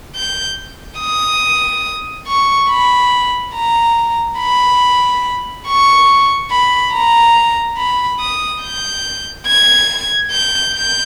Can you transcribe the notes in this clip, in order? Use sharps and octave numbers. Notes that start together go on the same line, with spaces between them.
G6
D#6
C#6
B5
A#5
B5
C#6
B5
A#5
B5
D#6
G6
G#6
G6
G6